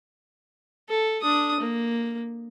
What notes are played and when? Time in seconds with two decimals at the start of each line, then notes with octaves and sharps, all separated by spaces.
0.88 A4
1.22 D4 D#6
1.60 A#3